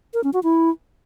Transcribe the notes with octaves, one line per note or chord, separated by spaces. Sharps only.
A#4
C#4
F#4
E4